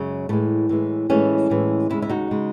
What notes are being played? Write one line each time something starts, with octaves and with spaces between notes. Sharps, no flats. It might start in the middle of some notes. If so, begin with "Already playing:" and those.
Already playing: F#2 C#3 F#3 G#3
A2 E3 G#3 A3
A2 E3 G#3
A2 E3 G#3 A3 C#4
A2 E3 G#3
D#2 C#3 G#3 C#4 E4
E4
D#4 F#4
C#3 G#3